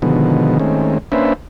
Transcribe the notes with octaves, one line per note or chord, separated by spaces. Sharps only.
B2 D3 D#3 F3 G#3 B3
D#3 G#3 A3 C4 C#4
A#3 C#4 D4 B4 C5 E5